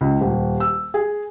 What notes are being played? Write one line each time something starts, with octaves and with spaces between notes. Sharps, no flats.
C#2
D#1
E6
G#4